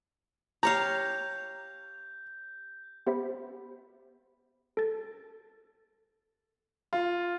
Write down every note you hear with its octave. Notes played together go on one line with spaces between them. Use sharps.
G4 C#5 F5 A#5 G6
B3 G4 C5 E5 B5 B6
A4 A6
F4